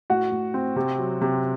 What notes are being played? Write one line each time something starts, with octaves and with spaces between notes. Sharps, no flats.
A2 F#4 F#5
A2
C4
C3
F#3
C3